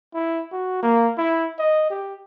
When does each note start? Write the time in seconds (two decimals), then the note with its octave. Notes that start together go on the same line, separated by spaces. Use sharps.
0.14 E4
0.52 F#4
0.83 A#3
1.18 E4
1.59 D#5
1.90 G4